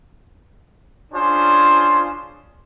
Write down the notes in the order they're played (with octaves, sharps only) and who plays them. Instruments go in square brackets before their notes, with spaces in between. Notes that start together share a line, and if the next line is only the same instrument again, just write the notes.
[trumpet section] C#4 D4 F4 G#4 C5